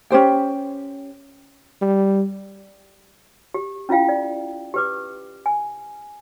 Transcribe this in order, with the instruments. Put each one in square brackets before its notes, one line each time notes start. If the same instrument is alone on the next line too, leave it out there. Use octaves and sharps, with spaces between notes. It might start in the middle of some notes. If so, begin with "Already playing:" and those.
[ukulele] C#4 G4 C5 G5
[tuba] G3
[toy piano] G4
C#4 E4 F4 F5 G5
D5
G4 B4 D6
G#5